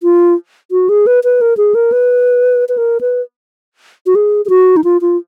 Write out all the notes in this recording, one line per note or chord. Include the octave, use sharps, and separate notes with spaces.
F4
F#4
G#4
B4
B4
A#4
G#4
A#4
B4
B4
A#4
B4
F#4
G#4
G#4
F#4
D#4
F4
F4